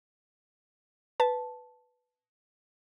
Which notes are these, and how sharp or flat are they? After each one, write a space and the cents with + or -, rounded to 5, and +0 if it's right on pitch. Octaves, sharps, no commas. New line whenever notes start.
B4 +5 A5 -5